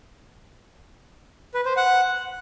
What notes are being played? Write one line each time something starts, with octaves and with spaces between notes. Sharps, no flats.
B4
C5
F#5